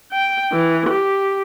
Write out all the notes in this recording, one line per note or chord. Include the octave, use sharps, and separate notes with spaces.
G5
E3
G4